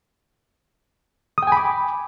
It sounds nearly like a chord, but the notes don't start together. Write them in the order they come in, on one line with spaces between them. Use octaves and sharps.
D#6 G5 G#5 B5 D6